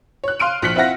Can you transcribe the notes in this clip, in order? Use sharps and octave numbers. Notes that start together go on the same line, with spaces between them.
C#5 F#6
F5 C6 F6 D7 D#7
A#1 F3 F#6 B6 C#7 F#7
C4 E4 F4 E5 F#5 A#6